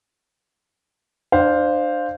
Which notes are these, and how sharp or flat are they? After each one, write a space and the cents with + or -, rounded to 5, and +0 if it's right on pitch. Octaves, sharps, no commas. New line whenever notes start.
D4 +30 C5 +0 F5 +0